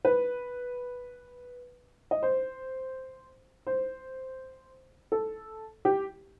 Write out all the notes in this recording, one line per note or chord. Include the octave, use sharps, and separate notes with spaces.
B4
D#5
C5
C5
A4
G4